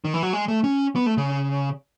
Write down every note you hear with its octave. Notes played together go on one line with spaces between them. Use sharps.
D#3
E3
F#3
G#3
A3
C#4
B3
A3
C#3